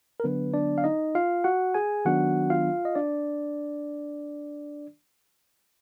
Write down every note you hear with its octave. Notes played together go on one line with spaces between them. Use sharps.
A#4
D3 F#3 B3 D4 B4
D4 D5
F5
D#4 D#5
F4 F5
F#4 F#5
G#4 G#5
D#3 F#3 B3 D4 F#4 F#5
F4 F5
D#5
D4 D5